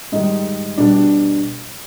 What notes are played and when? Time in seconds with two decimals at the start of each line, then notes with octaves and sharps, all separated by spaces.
0.12 G#2 D#3 G3 D#4
0.77 B2 G3 D4
0.94 D4